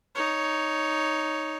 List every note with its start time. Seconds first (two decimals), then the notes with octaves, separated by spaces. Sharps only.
0.15 D#4 C#5